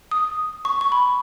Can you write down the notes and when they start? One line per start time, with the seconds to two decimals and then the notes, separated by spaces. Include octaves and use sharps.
0.11 D#6
0.65 C#6
0.81 C#6
0.92 B5